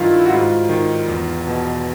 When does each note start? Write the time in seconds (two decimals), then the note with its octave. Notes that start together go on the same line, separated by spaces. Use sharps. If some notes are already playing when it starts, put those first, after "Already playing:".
Already playing: G2 D#3 E4 F4
0.26 F#4
0.30 G#2 F4
0.69 D#3
1.08 E2
1.47 B2